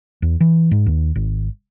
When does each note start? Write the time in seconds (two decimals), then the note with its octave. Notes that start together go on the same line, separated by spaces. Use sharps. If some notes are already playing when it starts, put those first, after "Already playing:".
0.22 E2
0.41 E3
0.71 G#2
0.86 D#2
1.16 G#1